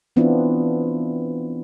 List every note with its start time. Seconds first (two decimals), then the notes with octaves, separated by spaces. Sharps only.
0.16 E3 B3 C4 D4 E4 F4